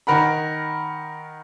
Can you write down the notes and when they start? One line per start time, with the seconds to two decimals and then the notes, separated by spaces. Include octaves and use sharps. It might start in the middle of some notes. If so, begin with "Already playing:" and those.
0.07 D#3 A#4 F#5 B5